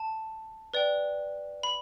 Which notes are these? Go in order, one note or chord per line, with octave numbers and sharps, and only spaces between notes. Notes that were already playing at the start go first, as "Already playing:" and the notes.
Already playing: A5
B4 D5 G5
B5